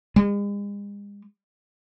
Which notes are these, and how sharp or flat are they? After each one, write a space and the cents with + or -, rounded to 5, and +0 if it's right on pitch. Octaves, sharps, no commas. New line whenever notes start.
G#3 -40